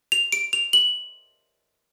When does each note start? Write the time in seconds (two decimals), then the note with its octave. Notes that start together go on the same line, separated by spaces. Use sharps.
0.12 F7
0.32 D7
0.53 F7
0.73 F#7